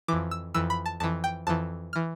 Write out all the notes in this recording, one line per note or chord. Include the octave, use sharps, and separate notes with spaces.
F2 E3 D6
E6
F2 E3 E6
B5
A5
F2 E3 A5
G5
F2 E3 A5
E3 F6